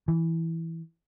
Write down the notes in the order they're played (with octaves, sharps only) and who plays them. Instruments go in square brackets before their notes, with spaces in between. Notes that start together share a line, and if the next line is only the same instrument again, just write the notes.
[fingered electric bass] E3